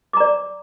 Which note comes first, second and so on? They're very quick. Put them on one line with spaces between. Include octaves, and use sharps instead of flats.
D6 A#5 D5